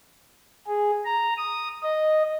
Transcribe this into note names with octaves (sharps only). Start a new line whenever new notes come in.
G#4
A#5
D#6
D#5